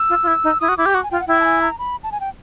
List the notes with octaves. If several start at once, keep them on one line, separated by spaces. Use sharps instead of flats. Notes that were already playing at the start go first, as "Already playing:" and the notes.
Already playing: E6
F4
F4
E4
D#4
E4 D#6
F#4
E4 D6
G4
F#4 D6
G#5
F4 G5
F#5
E4 G5
A5
G#5
A#5
B5
A5
G#5
G5